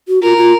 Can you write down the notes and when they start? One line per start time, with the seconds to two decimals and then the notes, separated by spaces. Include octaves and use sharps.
0.08 F#4
0.22 F4 A#4
0.37 F4